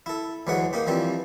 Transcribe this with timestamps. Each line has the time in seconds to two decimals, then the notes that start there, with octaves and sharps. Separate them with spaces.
0.06 E4 A4
0.47 D2 E3 F#3 G#3 F#5
0.73 A#3 D#4 G4
0.87 E3 F3 G3 C4